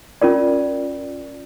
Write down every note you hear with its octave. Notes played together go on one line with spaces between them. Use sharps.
C#4 F4 A#4 D5